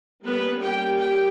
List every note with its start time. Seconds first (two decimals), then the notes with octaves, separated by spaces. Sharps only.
0.25 G3 A#3 B3 C#4 B4
0.61 G4 G5
0.98 G4 G5